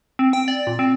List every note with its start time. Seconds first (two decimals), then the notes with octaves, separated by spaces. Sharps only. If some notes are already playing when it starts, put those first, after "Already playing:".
0.19 C4
0.33 G5
0.48 D5
0.67 A#2
0.79 C4